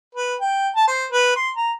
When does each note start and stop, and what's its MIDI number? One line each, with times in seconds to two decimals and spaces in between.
0.15 0.35 71
0.41 0.68 79
0.76 0.87 81
0.88 1.05 72
1.12 1.36 71
1.36 1.50 84
1.57 1.72 82